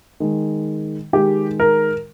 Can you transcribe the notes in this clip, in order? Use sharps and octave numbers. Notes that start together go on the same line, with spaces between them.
D#3 G#3
D#3 G#3 G4
A#4